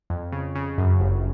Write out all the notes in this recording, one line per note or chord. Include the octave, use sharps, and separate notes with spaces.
F2
C#3
C#3
F#2
G1